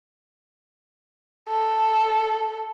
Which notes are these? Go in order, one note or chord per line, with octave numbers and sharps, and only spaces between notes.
A4